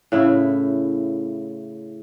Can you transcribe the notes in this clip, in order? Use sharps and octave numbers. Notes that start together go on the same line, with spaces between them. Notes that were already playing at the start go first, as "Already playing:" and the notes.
A2 C#3 E4